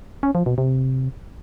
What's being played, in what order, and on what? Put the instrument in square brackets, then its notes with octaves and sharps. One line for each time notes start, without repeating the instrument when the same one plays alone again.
[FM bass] C#4
F3
B2
C3